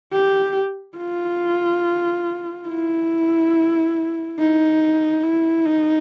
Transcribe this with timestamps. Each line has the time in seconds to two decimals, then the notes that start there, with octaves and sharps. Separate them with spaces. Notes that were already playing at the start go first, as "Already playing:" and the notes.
0.13 G4
0.98 F4
2.68 E4
4.38 D#4
5.23 E4
5.65 D#4